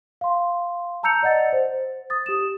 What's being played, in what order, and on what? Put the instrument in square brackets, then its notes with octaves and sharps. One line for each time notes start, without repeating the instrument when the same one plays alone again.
[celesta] F5 C6
A5 A#5 E6 G6 C#7 F7
D5 D#5 F#5 A6
C5
D#6 A6
G4 E7